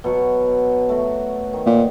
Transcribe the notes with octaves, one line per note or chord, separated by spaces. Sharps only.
B2 F#3 C#6
A3 F#4
D#3
A#2